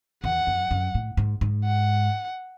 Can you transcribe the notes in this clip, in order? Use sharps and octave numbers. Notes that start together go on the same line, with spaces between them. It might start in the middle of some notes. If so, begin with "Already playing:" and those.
E2 F#5
F#2
F#2
A2
G#2
G#2
F#5